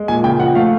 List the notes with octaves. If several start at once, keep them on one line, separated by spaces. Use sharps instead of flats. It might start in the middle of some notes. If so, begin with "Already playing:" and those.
Already playing: G#3
A#2 G#5
C#3 G5
F3 F#5
A3 F5